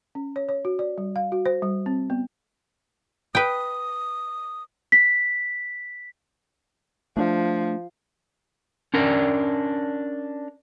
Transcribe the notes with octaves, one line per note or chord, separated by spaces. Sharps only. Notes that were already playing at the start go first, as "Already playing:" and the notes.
C#4
C#5
C#5
F#4
D5
G3
F5
F#4
C5
G3
C4
B3
B4 G5 D#6
B6
F3 A3 D4
C#4 D4 A#4 D5